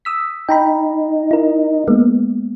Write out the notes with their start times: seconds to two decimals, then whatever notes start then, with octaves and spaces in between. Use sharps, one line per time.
0.05 D#6 E6 B6
0.49 D#4 G5 A#5 B5
1.31 E4 A#4
1.88 G#3 A#3 B3